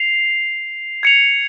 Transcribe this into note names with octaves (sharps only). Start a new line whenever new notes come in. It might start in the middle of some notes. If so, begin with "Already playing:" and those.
Already playing: C7 F7
G#6 C#7 F7